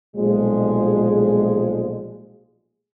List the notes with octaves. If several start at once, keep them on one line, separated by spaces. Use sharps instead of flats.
B1 A#2 F3 G3 G#3